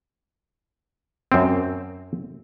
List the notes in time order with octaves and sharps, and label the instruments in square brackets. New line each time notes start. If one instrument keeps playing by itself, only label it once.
[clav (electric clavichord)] F#2 C4